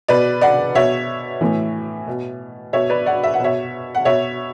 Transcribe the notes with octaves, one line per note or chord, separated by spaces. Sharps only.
B2 B4 D5
D5 F#5
B2 C#5 E5
A2 E3
B2
B2 C#5 E5
B4 D5
D5 F#5
E5
F#5
B2 C#5 E5
F#5
B2 C#5 E5